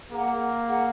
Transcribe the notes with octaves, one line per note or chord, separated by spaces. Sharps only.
A#3 G#4 F#5 A#5
G#4 F#5 A#5